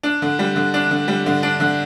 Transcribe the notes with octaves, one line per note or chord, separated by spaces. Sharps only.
D4
D3
G3
D3
D4
D3
G3
D3
D4
D3